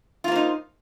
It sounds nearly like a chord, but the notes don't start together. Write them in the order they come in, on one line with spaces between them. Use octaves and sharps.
F4 A#3 C5 D#4